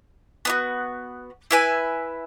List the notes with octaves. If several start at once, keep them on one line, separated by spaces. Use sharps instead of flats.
B3 D#4 F#4
E4 B4 E5 G#5